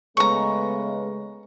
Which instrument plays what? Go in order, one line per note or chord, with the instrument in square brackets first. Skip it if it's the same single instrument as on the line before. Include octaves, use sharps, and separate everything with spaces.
[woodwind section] C#3 G#3 [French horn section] A3 B3 B4 [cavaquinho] A#5 C#6